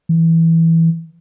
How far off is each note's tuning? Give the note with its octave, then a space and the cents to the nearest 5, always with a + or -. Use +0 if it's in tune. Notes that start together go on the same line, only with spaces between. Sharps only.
E3 -5